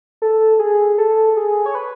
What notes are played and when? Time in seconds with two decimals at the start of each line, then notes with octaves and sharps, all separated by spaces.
0.22 A4
0.59 G#4
0.98 A4
1.37 G#4
1.66 C#5
1.75 B4